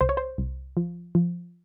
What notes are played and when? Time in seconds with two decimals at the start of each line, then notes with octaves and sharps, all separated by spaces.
0.01 C2 C5
0.09 C#5
0.17 C5
0.38 C2
0.77 F3
1.15 F3